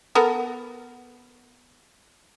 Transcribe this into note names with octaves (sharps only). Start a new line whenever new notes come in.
B3 A4 A#4